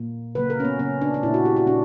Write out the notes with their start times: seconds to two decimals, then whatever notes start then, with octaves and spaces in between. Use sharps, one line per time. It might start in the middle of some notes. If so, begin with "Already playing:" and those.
Already playing: A#2 A#3
0.35 C#3 F#3 A#3 B4
0.50 A#4
0.60 C#4
0.65 B3
0.79 C#3 F#3 A#3 C#4
1.01 D4
1.14 D4
1.23 A#2 A#3 E4
1.34 F#4
1.45 G4
1.56 F#4
1.67 A#2 D4